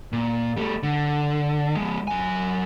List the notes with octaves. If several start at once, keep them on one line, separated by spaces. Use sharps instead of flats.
A#2
G3 A3
D3
F3 G#3
F#3 G#5